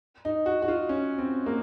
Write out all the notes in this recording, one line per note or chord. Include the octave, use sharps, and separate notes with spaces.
D#4
F#4
F#4
F4
C#4
C4
A#3